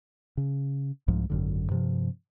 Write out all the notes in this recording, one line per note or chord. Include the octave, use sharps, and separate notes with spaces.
C#3
C2 G#2 F3
G#1 F#2 D3
G2 C3 F3